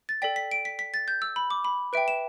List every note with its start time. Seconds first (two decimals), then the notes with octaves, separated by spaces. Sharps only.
0.09 A6
0.22 A4 D5 G5 B6
0.36 B6
0.51 D7
0.65 B6
0.79 B6
0.94 A6
1.08 G6
1.22 E6
1.36 B5
1.50 D6
1.65 B5
1.93 B4 E5 G5 D7
2.08 E7